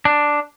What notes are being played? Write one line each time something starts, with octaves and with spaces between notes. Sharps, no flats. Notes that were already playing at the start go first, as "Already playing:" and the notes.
D4